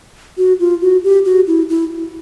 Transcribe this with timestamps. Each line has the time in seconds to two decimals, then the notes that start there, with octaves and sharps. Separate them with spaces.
0.38 F#4
0.60 F4
0.82 F#4
1.03 G4
1.25 F#4
1.47 E4
1.69 E4